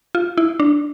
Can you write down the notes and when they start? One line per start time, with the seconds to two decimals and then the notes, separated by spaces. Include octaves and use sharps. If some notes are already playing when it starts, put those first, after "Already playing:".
0.15 F4
0.37 E4
0.60 D4